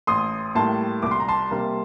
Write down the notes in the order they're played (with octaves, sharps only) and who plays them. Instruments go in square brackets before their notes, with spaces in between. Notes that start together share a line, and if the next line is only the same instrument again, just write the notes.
[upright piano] A1 C6 D#6
A2 G3 A#3 A5 C6
C2 D6
C6
A#5
A5 C6
C3 G3 A#3